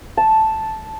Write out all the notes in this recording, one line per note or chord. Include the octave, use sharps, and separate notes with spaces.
A5